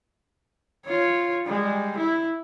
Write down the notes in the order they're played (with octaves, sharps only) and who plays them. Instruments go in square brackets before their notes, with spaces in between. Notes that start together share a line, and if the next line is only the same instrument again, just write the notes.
[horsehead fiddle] F4 C#5
G3 G#3
E4